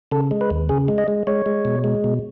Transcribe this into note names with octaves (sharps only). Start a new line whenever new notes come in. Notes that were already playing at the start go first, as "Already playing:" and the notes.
C#3 A4
G#3
B4
D#2
C#3 G#4
G#3
D#5
G#3
G#3 C#5
G#3
B2
G#3
B2